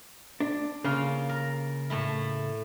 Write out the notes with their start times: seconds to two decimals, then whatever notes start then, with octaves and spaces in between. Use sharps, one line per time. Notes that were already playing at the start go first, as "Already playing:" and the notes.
0.40 D4
0.84 C#3 A#3 F4 F5
1.29 A#4
1.90 A2 A3 E4